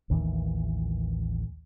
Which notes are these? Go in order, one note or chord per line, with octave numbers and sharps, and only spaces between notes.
A1 D#2 D#3 E3